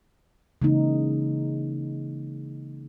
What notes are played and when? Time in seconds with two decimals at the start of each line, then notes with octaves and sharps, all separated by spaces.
0.62 C#3 E3 G#3 A#3 D#4